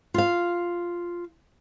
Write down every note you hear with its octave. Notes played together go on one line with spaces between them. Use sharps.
F4 F5